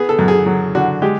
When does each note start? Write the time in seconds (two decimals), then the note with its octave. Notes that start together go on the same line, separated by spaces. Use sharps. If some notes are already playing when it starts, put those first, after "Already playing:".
Already playing: B3 G#4
0.09 A4
0.19 F#2
0.28 G#4
0.46 F#3
0.75 D3 F#4
1.02 G#3 G4